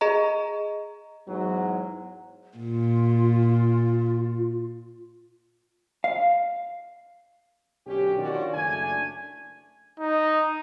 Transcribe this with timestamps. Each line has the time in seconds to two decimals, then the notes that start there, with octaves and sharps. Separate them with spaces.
0.01 G#4 D#5 A#5
1.27 E2 G#2 F#3
2.58 A#2 F4
6.04 F5
7.87 B1 D3 C#4 G4
8.18 D#3 C#4 D4 F4 F#4 D5
8.53 F#1 A3 D4 G#5
9.99 D#4